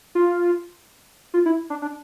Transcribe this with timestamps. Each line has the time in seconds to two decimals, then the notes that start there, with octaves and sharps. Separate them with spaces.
0.15 F4
1.34 F4
1.46 E4
1.70 D4
1.82 D4